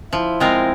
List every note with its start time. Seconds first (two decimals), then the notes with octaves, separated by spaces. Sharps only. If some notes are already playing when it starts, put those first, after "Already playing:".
0.12 F3 E4
0.40 G#3 C4 F4 A#4